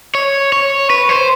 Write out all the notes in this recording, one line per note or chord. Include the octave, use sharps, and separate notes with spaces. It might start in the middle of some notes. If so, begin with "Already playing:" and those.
C#5
C#5
B4
C5